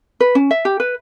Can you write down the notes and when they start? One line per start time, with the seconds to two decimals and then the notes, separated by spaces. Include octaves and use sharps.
0.20 B4
0.35 C#4
0.51 E5
0.65 G4
0.80 B4